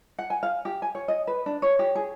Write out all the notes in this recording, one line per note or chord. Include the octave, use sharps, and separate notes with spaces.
F#5
G#5
F5
G4
G#5
C#5
D#5
B4
D4
C#5
G4
G#4